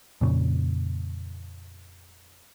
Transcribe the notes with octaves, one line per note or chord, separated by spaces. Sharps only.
F2 A#2 C#3